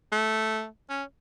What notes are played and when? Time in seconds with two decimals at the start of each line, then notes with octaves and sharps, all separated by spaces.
0.12 A3
0.90 C#4